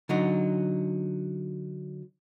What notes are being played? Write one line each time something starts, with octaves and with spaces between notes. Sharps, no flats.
D3 F#3 D#4